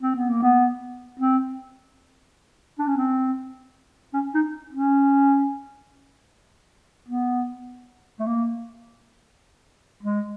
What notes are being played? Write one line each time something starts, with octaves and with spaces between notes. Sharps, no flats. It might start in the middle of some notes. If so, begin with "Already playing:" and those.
C4
B3
A#3
B3
C4
D4
C#4
C4
C#4
D#4
C#4
B3
A3
A#3
G#3